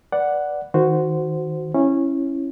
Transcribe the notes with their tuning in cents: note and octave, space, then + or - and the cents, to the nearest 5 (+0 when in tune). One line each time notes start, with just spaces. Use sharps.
B4 +0 D5 +0 F#5 +0
D#3 +15 F#4 +0 C5 -10
C#4 -15 E4 +5